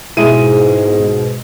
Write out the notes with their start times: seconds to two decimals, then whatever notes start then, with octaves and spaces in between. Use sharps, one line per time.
0.17 G#2 B2 G#3 E4 D#7